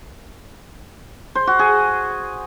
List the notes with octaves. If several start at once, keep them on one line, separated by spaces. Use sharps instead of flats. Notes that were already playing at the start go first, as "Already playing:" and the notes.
C5
F#4
G#4